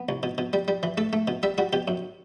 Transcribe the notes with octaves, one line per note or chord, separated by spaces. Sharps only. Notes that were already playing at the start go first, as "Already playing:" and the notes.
Already playing: B3
C2
B2
B2
G3
G3
E3
A3 A4
A3
B2
G3 E5
G3 F#4
B2 G4
F#2